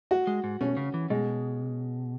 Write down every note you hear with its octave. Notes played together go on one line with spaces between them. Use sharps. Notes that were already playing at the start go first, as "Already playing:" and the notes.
F#4
G#3
G#2
B2 C#4
C#3
E3
B2 G#3